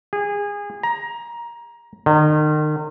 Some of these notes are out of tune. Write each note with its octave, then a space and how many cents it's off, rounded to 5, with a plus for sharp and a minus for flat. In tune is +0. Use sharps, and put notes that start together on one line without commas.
G#4 -25
A#5 +15
D#3 -35